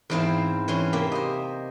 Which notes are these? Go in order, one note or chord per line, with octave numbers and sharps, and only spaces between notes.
E2 G#2 C4 E4 C5 F5
E3 C#4 E4 C6
C3 A#3 G4
C5 D#5